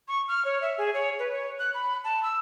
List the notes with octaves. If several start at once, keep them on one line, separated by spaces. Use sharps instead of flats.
C#6
F6
C#5
E5
G#4
C#5
B4
C#5
F#6
B5
A5
E6